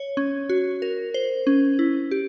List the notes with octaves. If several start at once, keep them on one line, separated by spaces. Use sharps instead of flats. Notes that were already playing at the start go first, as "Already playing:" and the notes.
Already playing: C#5
C#4
F#4
A#4
C5
C#4
E4
G4